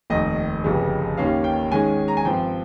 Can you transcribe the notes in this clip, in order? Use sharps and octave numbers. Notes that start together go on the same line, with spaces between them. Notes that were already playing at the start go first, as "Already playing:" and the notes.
F1 D#2 D#3 D#5
G1 F2 C#3 G3
D#2 D#3 G3 A#3 C#4 F5
G5
G#2 D#3 G#3 C#4 G#5
A#5
G#5
G2 F3 C4 G5